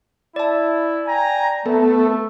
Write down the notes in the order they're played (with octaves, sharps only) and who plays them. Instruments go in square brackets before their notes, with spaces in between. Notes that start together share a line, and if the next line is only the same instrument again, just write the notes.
[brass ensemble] E4 [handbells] D5 A5
[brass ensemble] G5 G#5 A#5
[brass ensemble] A3 [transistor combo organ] B3 A4